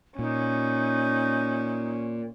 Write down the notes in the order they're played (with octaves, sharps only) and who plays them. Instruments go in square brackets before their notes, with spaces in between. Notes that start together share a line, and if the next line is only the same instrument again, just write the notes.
[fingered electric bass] A#2 [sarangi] C#4 [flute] D#4